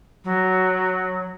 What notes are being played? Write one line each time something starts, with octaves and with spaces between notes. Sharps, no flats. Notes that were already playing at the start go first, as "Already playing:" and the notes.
F#3